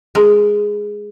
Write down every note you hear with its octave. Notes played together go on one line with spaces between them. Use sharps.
G#3 A#4